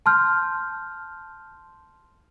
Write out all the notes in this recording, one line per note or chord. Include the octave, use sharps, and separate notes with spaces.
A5 C6 F6 G6